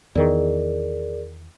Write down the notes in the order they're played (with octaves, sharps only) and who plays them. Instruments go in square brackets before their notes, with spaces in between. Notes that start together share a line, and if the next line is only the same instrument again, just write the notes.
[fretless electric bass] E2 D#3 [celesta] G#4 A#4 D5